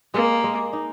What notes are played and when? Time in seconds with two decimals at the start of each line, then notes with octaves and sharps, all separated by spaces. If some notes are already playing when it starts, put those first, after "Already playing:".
0.14 G#3 A#3
0.44 G#3
0.73 D#4